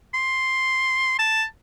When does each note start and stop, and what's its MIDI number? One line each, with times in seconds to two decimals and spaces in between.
0.14 1.15 84
1.19 1.44 81